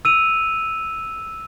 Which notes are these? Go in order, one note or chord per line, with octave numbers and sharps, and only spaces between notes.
E6 D#7 F7